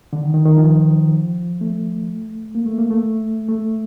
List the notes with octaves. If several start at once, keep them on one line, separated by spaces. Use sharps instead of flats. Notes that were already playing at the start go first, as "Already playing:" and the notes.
D3
D#3
D#3
D#3
F3
A3
A#3
A3
A#3
A3
A3